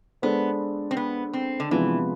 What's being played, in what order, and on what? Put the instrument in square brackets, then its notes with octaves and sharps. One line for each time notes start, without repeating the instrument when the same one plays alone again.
[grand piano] G#3 D4 A4 C5 [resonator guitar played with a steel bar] B3
[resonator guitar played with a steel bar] C4
B3
C4
D3
[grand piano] C3 F3 G#3 B3 [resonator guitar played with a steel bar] E3